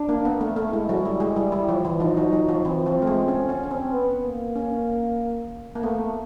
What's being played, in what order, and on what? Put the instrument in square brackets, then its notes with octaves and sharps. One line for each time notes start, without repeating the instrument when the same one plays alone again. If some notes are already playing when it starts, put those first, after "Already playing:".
Already playing: [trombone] D4
[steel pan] A#3
B3
A3
A3
[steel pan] G#3 [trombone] E4
[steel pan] F#3
G3
G#3
[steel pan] G3 [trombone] E4
[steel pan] G3
F3
E3
[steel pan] F3 [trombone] D#4
[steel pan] F#3
F#3
F3
[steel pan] E3 [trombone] C4
[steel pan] F3
A3
G#3
C#4
C#4
C#4
C4
[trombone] B3
A#3
[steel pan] C#4
A#3
[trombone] A3 [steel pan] B3